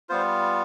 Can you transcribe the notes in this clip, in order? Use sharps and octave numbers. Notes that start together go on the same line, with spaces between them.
G3 B3 F4 C5